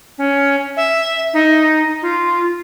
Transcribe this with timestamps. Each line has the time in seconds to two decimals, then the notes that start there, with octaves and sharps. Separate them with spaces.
0.18 C#4
0.77 E5
1.34 D#4
2.02 F4